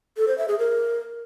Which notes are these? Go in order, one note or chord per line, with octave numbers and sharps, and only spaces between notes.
A4
C5
E5
G#4
A#4